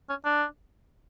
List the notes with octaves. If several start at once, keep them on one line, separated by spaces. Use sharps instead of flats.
C#4
D4